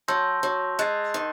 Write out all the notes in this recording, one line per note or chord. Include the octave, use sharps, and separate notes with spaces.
F#3 A5 C6 E6 G6 A#6
F#3
G#3 F#6 A6 C7
D#3